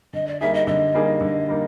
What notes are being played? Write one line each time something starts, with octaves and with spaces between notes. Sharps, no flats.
D3 D#5
D5
G3 A#3 D#4 G#4 E5
D#5
D3 D#5
G3 A#3 D#4 G#4
D3
G3 A#3 D#4